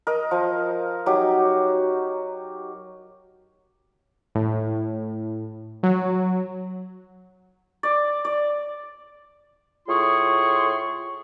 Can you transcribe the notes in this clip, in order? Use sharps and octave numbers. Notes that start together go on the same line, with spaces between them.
A#4 D#5
F3
F#3 D#4 G4
A2
F#3
D5
D5
A2 F4 G#4 C6 C#6